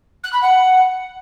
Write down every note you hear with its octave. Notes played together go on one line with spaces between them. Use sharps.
F#6
B5
F#5